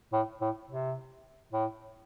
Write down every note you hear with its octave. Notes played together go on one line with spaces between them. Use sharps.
A2
A2
C3
A2